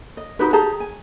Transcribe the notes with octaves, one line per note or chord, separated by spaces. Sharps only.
D#5
D#4 F#4 G4 B4
G4 G#4 A5 A#5
G#5